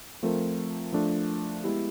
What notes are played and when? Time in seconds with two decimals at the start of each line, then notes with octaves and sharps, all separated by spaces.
0.23 F3 A3 C4 F4 A#4
0.92 F3 A3 D4
1.64 G#3 B3 E4 G4